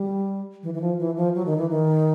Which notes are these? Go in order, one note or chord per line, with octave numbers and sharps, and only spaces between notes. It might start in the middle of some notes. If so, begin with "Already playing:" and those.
Already playing: G3
E3
E3
F3
E3
F3
F#3
D#3
E3
D#3